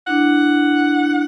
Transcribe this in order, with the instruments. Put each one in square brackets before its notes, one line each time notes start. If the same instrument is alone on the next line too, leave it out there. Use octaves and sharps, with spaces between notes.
[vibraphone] D4 E4 [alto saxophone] F#5